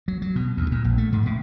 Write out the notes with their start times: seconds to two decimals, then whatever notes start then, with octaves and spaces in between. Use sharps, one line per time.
0.08 F#3
0.22 F#3
0.36 B2
0.57 D2
0.72 A#2
0.84 A#1
0.98 A3
1.13 G#2
1.26 A2